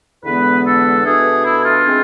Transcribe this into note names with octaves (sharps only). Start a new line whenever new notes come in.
E2 D3 G#3 B3 B4
A4
B2 A3 D4 G#4
E4
F4
G#3 C4